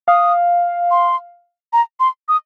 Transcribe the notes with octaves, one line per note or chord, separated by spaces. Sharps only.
F5 D#6
C6
A#5
C6
D#6